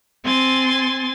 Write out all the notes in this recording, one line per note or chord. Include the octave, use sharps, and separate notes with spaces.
C4 G#5 C6 A6